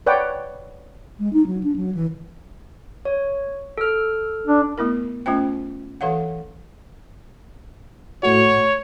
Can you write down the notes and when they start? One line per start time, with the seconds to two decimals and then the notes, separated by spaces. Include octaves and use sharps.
0.06 B4 C#5 D5 F#5 G5
1.19 G#3
1.33 D#4
1.46 F#3
1.63 D4
1.76 F#3
1.95 E3
3.05 C#5
3.78 A4 F6
4.47 D4
4.78 A3 B3 E4 A#4
5.26 A3 C#4 F4 C5 G5
6.01 E3 A4 C#5 F5 F#5
8.23 A2 A3 F#4 C#5